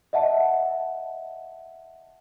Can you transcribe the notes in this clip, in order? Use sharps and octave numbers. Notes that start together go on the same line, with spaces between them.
D#5 E5 F#5 A5